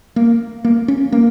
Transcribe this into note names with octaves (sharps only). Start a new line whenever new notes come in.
A#3
A#3
C#4
A#3